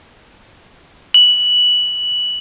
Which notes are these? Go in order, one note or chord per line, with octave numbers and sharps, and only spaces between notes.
F#7